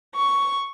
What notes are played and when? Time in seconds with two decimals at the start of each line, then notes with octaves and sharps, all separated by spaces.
0.16 C#6